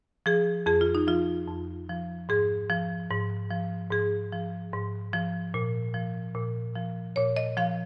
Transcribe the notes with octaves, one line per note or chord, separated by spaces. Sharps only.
F3 G#4
F2 G#4
F4
D#4
F3 F4
F2
F3
G#2 G#4
F3
G#2
F3
G#2 G#4
F3
G#2
F3
A#2
F3
A#2
F3
A#2 C#5
D#5
F3 F5